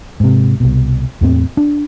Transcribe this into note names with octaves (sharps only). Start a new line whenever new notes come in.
G#2 C3
C2 B2
E2 A2 C4
D4